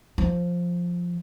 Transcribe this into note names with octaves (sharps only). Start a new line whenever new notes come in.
F3